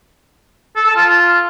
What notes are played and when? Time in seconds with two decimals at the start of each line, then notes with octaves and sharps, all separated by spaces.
0.76 A4
0.86 A5
0.96 F4